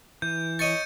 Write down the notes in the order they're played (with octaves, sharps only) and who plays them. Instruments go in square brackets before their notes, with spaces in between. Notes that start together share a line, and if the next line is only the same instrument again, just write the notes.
[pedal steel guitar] E3 [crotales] G6
[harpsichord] C#5 D#5 C#6 [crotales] A6 C#7 D#7